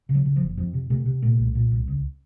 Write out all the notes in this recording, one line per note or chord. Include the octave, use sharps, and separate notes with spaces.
C#3
F#3
C#3
F3
F#1
F2 F3
C3
C3 A3
C3
A#2 A3
C2
A#2
C2
C#2